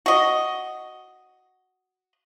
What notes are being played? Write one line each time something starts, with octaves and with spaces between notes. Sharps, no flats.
F#4 D#5